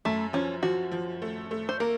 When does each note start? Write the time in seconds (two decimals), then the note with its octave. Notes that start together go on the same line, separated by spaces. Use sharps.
0.05 F#2 A3
0.33 F3 C#4
0.63 F3 F#4
0.92 F3
1.22 A3
1.51 A3
1.69 C5
1.80 A#3 A#4